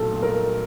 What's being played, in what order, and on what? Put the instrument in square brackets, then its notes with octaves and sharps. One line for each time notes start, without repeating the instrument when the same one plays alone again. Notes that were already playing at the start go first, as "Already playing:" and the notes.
Already playing: [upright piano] B1 A#2 F#3 A3 [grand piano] A4
[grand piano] A#4